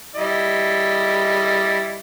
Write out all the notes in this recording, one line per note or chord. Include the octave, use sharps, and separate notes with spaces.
G3 E4 D#5